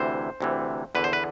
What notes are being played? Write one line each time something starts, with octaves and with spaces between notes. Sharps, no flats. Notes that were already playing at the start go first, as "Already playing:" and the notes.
Already playing: D2 C3 E3 C5
D2 C3 E3
E2 D3 B4
C5
B4